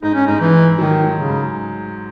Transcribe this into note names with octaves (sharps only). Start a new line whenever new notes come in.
G#2 D#4
C#4
G#2 D#4
E3
G#2
D#3 F#3
F#3
C#3
G#2